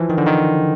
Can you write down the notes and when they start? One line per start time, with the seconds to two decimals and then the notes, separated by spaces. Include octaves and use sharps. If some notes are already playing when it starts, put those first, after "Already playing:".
Already playing: E3 F3
0.10 D#3
0.18 D3
0.26 D#3